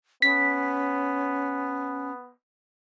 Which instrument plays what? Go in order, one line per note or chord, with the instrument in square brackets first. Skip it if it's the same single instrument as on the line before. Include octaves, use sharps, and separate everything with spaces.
[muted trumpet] B3 [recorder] C#4 [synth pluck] B6